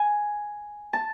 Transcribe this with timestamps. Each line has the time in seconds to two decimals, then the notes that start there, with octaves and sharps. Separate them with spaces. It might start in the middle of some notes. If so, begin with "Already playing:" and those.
Already playing: G#5
0.93 A5